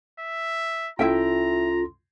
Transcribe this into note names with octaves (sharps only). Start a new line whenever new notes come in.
E5
C2 C#4 E4 F4 A4 E5 G5 A#5